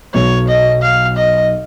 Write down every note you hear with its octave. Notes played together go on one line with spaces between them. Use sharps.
B1 B2 F#3 C#5
D#5
F5
D#5